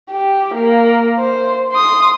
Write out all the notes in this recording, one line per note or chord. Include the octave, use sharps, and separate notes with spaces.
G4
A#3
C5
C6 D#6